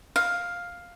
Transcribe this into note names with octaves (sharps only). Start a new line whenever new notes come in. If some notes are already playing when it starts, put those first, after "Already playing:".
F5